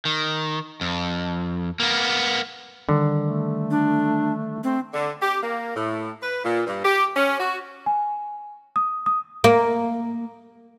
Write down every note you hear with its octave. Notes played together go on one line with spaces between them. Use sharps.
D#3
F2
A#3 B3
D3 D#3 G3
A3
D4
A3 C4
D3
G4
A#3
A2
B4
A#2
G2
G4
C#4
F#4
G#5
D#6
D#6
A#3